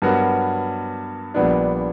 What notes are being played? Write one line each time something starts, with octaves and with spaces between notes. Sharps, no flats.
G2 F#3 B3 F#4 A#4
A#1 A#2 G3 B3 D4